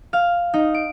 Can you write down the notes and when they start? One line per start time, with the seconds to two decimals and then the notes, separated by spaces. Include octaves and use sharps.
0.13 F5
0.54 D#4
0.74 D7